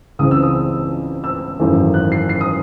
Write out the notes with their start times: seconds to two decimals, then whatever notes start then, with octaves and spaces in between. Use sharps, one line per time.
0.19 C#2 C#3 E3 C4 D#6
0.31 E6
0.43 D#6
1.24 E6
1.59 G#1 F#2 E3 A3
1.94 F#6
2.12 C7
2.29 C7
2.41 D#6